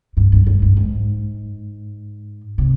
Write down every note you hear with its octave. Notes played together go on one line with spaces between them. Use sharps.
G2
G2
G2
G2
G#2
C3